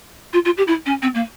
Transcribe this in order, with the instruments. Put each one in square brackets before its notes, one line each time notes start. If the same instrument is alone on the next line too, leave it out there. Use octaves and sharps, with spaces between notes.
[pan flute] F4
F4
G4
E4
C#4
C4
A#3